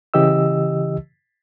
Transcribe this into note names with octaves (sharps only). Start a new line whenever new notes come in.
C#3 E3 G4 D#5 E6